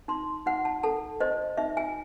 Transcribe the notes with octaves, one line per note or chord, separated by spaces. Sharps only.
D#4 C6
D#4 F#5
A5
A4 A5
C5 D#5
D#4 E5
G#5